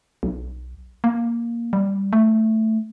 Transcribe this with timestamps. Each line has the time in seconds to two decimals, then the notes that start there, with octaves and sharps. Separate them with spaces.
0.23 B1
1.04 A#3
1.73 G3
2.13 A3